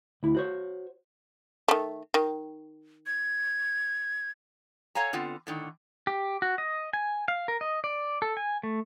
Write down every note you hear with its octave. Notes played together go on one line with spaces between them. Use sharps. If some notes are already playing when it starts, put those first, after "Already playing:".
D2 E4
F#4 C5 C#5
D#3 A3
D#3
G#6
A4 C#5 F5 G#5 A#5
D3 B3 C4 F4
A2 D3 D#3
G4
F#4
D#5
G#5
F5
A#4
D#5
D5
A4
G#5
A3